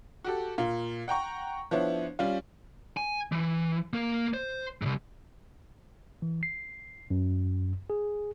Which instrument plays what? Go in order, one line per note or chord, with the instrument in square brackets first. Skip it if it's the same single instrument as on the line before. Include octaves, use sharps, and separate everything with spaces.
[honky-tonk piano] F#4 G4 A4
A#2 F4
F#5 G5 A#5 C#6
F3 B3 D4 E4 C#5
G3 C#4 F4
[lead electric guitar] G#5
E3
A#3 A#4
C5
C2 G#2
[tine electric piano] E3
C7
F#2
G#4